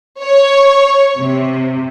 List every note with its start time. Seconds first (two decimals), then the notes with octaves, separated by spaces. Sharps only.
0.22 C#5
1.18 C3